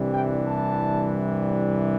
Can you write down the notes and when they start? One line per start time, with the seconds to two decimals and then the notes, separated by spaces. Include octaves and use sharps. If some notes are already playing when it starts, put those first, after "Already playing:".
Already playing: C2 C3 E3 G3 D4
0.13 G5
0.47 A5